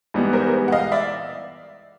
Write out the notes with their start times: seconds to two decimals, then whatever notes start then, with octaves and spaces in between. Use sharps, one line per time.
0.14 G#2 E3 G3 B3
0.33 A#4 C5
0.68 F#5
0.72 D#5 F5
0.92 D5 E5